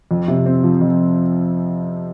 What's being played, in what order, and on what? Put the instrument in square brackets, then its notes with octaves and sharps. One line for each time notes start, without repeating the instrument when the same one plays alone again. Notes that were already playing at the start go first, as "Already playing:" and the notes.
[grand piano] F2
C3
C4
F3
F2